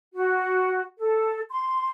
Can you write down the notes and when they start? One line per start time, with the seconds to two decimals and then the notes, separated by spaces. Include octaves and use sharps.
0.14 F#4
0.98 A4
1.50 C6